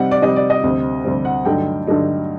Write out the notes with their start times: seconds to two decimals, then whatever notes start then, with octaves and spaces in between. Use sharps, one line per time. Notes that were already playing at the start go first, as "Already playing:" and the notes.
Already playing: C3 G3 C4 D#4 F#5
0.11 D5
0.22 C3 G3 C4 D#4 D#5
0.36 D5
0.50 D#5
0.63 D2 C3 G3 C4
1.04 D2 C3 G3 C4
1.25 F#5
1.45 G2 D3 F#3 A3 D#4 G5
1.87 G2 D3 F#3 A3 D#4